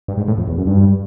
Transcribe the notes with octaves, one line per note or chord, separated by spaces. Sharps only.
G2
G#2
A2
F2
E2
F#2
G2